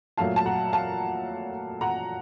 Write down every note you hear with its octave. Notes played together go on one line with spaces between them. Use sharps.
A#2 F#3 A3 F5 A5
A5
F#5 A#5
F5 A5
F#5 A#5